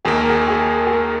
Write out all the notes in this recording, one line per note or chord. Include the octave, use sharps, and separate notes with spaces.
D#2 D#3 A#3 G#4
A#4
G#4
G#4
G#4
A#4